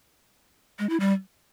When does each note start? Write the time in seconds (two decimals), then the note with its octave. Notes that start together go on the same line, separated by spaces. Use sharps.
0.79 G#3
0.89 E4
1.00 G3